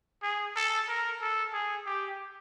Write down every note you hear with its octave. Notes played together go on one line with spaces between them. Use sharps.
G#4
A4
A#4
A4
G#4
G4